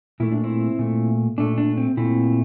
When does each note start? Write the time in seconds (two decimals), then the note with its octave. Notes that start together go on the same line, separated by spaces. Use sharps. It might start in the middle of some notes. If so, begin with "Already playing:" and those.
0.20 A#2 A3 E4
0.32 D4
0.44 C4 E4
0.79 A#2 A3
1.38 A#2 A3 D4
1.58 D4
1.77 C4
1.97 A#2 A3 C4 E4